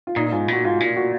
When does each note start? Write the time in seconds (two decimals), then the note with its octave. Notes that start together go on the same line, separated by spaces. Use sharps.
0.07 F4
0.16 A#2 D#4
0.26 D#4
0.32 G#2 F4
0.48 A#2 F#4
0.64 G#2 F4
0.80 A#2 F4
0.96 F#4